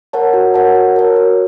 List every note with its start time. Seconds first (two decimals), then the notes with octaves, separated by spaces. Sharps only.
0.13 A#4 C#5 F#5 A5
0.34 F#4
0.54 A#4 C#5 F#5 A5
0.75 F#4
0.96 A#4 C#5
1.16 F#4